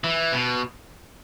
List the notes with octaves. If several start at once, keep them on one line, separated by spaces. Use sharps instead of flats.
E3
B2